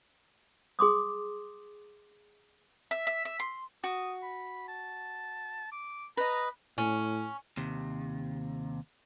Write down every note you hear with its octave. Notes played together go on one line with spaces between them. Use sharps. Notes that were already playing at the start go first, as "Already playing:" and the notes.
G#4 C6 D6 D#6
E5
E5
E5
C6
F#4 D#6
B5
A5
D6
B4 D#5 A#5
A2 C#4
D#2 C3